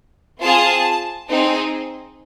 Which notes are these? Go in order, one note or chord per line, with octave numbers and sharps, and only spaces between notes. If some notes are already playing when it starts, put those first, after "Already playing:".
C4 F4 G#4 A5
C4 D#4 G#4